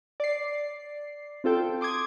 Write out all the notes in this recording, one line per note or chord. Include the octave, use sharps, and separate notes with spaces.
D5 C7
C4 F4 A4 G5
C6 D6 D#6 G#6